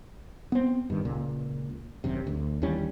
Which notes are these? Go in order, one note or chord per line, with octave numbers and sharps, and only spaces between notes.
B3 C4
G2 D#3
C#2 A#2
G#1 F#2 C3
D2
D#2 E3 G3 C#4